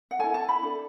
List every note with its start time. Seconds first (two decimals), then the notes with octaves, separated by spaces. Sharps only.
0.11 F#5
0.19 E4 A4 G#5
0.34 A5
0.49 B5
0.63 D4 A4